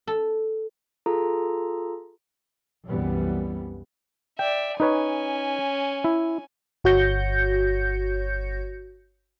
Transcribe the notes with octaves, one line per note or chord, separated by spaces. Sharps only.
A4
F4 G#4 A4 A#5
C2 F#2 E3 G3 B3
D5 E5 G5
C#4 D#4 B4 C#5 G#5
E4
G1 F#4 C#5 G6 A#6 C#7